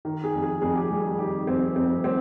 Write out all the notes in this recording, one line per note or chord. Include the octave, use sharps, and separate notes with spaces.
D#3
G#4
F2
G#4
F2 G#4
G4
G#4
G3
G#4
D#3 G4
F2 C4
F2 C4
G3 C4